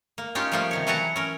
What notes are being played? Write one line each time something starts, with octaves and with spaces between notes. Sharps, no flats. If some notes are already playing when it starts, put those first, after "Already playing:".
A#3
C#4 D#4 F4 G4
F3 G3 A3 A#3 F4 G4
C3 D#3 C#5
E3 F#3 B4 F#5 A5 A#5
C#4 A#4